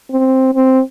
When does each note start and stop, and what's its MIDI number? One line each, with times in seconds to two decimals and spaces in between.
0.11 0.54 60
0.55 0.80 60